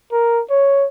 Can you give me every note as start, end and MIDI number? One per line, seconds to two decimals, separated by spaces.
0.12 0.41 70
0.50 0.86 73